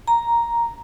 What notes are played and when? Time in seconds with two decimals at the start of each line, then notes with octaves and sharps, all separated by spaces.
0.08 A#5